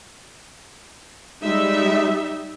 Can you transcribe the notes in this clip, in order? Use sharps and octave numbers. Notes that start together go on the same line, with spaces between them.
G3 G#3 D#4 E5